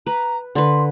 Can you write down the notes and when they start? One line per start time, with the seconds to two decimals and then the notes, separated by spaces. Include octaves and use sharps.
0.07 B4 A#5
0.55 D3 B4 C6